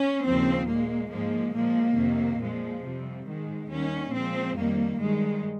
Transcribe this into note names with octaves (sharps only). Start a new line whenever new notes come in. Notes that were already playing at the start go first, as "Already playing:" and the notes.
Already playing: C#4
D#2 C#3 F3 C4
A#2 G#3 A#3
G#2 F3 G#3 A#3
A#2 F3 G#3 A#3
F2 C3 D#3
A#2 F3 G#3
F2 C3 G3
G#2 D#3 G#3
D#2 D#3 G3 C#4
A#2 F3 G#3 C4
F2 D#3 G3 A#3
G2 D#3 G3 G#3